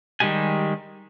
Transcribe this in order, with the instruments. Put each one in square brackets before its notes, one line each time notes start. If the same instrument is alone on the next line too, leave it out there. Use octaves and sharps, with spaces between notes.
[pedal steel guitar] D#3 G3 G#3 G4 G#5